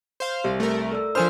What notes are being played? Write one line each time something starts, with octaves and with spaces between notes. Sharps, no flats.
C5 F5
C2 G4
A3 A#4
A4 D5 E6
F3 D4 A#4 C5 G#5 D#6 F6